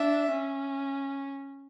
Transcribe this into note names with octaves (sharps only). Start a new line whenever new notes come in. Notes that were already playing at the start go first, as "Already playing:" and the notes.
Already playing: D4 E5
C#4